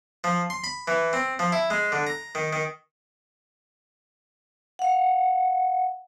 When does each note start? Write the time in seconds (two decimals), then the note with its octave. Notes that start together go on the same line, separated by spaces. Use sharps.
0.24 F3
0.50 C6
0.64 B5
0.88 E3
1.13 C4
1.39 F3
1.52 E4
1.70 G#3
1.92 D3
2.07 A#5
2.35 D#3
2.53 D#3
4.79 F5 F#5